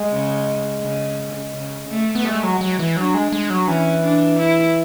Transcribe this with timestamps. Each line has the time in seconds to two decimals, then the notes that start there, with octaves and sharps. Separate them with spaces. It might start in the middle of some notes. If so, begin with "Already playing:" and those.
Already playing: G#3
0.11 C#3
0.82 C#3
1.54 C#3
1.89 A3
2.15 B3
2.25 G#3 A3
2.43 F#3
2.61 F#3
2.79 E3
2.97 F#3 D4
3.14 G#3
3.32 G#3
3.50 F#3
3.68 E3 C#4
4.03 D4
4.39 E4